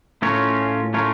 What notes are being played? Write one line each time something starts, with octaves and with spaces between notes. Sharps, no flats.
A2 A3 C#4 F4 A#4 C#5
A3 C#4 F4 A#4 C#5